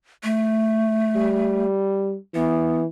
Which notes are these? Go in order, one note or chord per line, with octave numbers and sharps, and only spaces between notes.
A3
G3
E3 B3